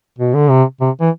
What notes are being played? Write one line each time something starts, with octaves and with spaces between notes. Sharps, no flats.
B2
D3
C3
C3
E3